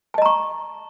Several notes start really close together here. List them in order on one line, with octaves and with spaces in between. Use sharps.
A5 D#5 A#5 C#6